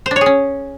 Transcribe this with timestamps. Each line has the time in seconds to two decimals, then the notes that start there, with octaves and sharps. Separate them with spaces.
0.06 C5
0.11 D4
0.16 C#5
0.21 G#4
0.26 C#4